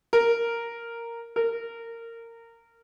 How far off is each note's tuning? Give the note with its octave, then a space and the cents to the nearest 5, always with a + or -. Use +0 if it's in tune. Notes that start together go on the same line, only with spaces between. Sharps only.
A#4 -5
A#4 -20